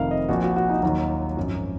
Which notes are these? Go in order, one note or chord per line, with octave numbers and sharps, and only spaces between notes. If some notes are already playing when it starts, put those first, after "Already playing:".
Already playing: F1 F2 D#3 A#4 F5
D#5
A#1 A#2 F3 F#4
F#4
F#4
D#4
D#2 D#3 F#3 D#4
G#1 F#2 F3